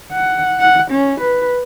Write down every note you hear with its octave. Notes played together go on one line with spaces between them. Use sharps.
F#5
F#5
C#4
B4